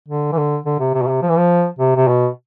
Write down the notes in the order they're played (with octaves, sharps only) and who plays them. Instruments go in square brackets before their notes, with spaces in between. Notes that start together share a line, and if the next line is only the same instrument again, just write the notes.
[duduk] D3
E3
D3
D3
C3
C3
B2
C3
F3
E3
F3
C3
C3
B2